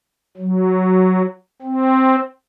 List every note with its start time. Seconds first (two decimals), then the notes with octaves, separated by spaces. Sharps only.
0.37 F#3
1.62 C4